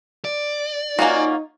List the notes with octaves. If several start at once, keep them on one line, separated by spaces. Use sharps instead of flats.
D5
A#3 C#4 D#4 F4 F#4 F5 G#5